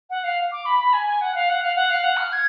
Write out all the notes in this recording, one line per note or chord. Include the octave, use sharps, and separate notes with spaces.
F#5
F5
D6
B5
B5
G#5
G#5
F#5
F5
F#5
F5
F#5
F5
F#5
F6
G#6